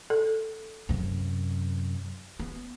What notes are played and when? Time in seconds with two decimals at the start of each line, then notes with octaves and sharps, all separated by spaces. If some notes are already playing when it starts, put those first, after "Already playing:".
0.10 A4
0.89 F#2 C3
2.40 B3